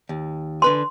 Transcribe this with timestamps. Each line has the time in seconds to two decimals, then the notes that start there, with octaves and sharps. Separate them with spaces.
0.09 D#2
0.62 D3 B4 G#5 C6